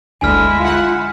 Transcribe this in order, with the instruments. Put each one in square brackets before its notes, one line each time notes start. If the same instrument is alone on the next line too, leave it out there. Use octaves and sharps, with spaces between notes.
[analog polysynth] G1 D2 D3 [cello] G#3 E4 [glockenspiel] G#5 F6
[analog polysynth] F4 F#5